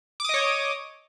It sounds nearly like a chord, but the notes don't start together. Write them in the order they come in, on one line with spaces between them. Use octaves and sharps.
D6 D#6 D#5 C#5